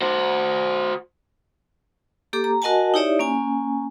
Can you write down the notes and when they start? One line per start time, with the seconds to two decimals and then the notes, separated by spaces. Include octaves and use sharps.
0.01 F#4 C5
2.33 A#3 G4 A4 D6
2.44 A#5
2.62 F#4 A#4 D#5 F#5 G#5 A5
2.94 D#4 E4 G4 C#5 D5 E5
3.19 A#3 C#4 G#5